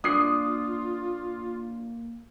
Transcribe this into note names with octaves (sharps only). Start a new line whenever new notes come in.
A#3 D4 F4 D#6 C7